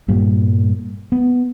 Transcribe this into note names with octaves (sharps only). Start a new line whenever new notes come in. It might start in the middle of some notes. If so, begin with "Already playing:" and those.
G2 A#2 G3
B3